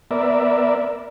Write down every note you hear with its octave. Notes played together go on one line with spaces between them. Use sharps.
B3 A#4 D5 E5